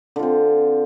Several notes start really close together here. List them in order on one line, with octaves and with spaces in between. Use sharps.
D3 F4 C4